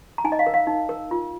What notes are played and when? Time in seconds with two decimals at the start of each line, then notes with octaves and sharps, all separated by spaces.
0.18 A#5
0.24 D#4 G#5
0.32 D#5
0.39 F5
0.47 A#4
0.54 F5
0.67 D#4
0.89 A#4
1.11 F4